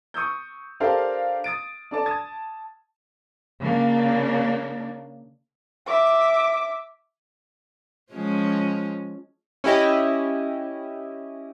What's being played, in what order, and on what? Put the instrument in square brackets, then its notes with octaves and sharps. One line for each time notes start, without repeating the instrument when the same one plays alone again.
[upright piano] C#6 D#6 E6 G6
D4 G4 A4 A#4 C5 F5
D#6 A6 D7
D4 A4 D5 A5
A5 D#6 G#6 A6
[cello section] C#3 A#3 D4
[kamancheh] E5 D6
[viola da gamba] F3 G#3 C#4
[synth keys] C#4 E4 G4 D#5